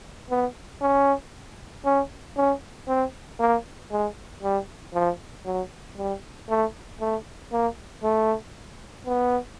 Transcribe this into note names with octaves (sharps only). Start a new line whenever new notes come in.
B3
C#4
C#4
C#4
C4
A#3
G#3
G3
F3
F#3
G3
A3
A3
A#3
A3
B3